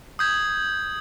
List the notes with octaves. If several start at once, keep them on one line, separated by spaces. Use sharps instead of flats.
D#6 G6 G#6